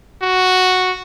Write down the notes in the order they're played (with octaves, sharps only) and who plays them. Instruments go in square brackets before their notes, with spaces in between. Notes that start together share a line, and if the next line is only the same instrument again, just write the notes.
[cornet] F#4